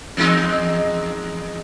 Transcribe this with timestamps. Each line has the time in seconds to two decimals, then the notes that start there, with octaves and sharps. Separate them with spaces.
0.17 E2 G#3 D#4